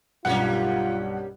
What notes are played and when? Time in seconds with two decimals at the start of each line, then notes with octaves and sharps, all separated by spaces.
0.25 B1 G2 G3 A#3 C#4 F4 F#5